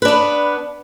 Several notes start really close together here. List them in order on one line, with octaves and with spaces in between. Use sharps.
B4 D4 B3